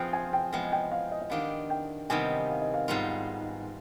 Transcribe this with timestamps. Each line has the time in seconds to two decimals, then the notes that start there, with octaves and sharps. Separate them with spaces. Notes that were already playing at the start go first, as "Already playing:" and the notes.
Already playing: F3 C4 F4 G#4 B4 G5
0.13 G#5
0.33 G5
0.52 F3 G#3 B3 G5
0.72 G5
0.92 F5
1.12 D#5
1.22 D#5
1.30 D#3 B3 D4 G4 F5
1.70 G5
2.10 C3 D#3 G3 B3 G#5
2.49 F5
2.62 D#5
2.74 F5
2.88 G#2 G3 B3 F4